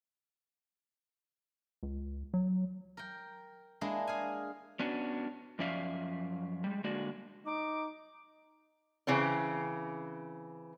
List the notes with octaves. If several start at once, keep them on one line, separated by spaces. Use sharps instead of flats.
C#2
F#3
A#4 G5
G#3 A#3 D4 E4 G#4
G#4 F5 G#5
B3 C#4 D4 F#4
F#2 F3 C#4 D5 E5 F5
G3 G#3
D3 G#3 A#3 F#4 D5
D#4 D6
C#3 E3 C4 C#4